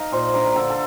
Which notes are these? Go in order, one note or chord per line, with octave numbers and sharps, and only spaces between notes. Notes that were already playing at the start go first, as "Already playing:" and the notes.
Already playing: D#4 D#5 F5
A#2 C5
D4 A#4
A#4
D3 A4
A4